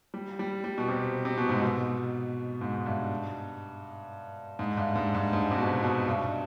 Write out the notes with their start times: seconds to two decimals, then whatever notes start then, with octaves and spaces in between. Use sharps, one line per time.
0.14 G3
0.39 G3
0.64 G3
0.78 B2
0.88 C3
1.25 C3
1.37 B2
1.49 G#2
1.61 B2
2.61 G#2
2.86 G2
4.59 G#2
4.77 G2
4.96 G#2
5.15 G2
5.33 G#2
5.51 C3
5.58 B2
5.82 B2
6.07 G2